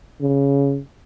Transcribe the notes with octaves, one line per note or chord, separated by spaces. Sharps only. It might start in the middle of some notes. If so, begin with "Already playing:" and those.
C#3